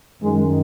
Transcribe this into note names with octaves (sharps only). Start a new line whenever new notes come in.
F#2 D#3 G#3